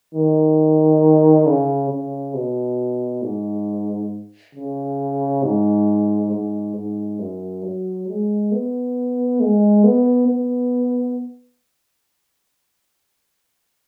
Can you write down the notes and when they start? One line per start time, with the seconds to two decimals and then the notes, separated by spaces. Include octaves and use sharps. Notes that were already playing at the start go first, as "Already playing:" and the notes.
0.14 D#3
1.46 C#3
1.90 C#3
2.35 B2
3.23 G#2
4.55 C#3
5.43 G#2
6.31 G#2
6.75 G#2
7.19 F#2
7.64 F#3
8.08 G#3
8.52 B3
9.40 G#3
9.84 B3
10.28 B3